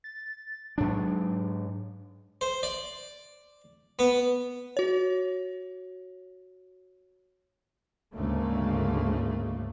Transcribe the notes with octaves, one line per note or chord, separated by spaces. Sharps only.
A6
G#2 F#3 D4
C5
D5
B3
F#4 C#5
D2 G#2 C#3 A3 A#3